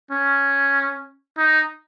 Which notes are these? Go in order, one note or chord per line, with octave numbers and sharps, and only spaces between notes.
C#4
D#4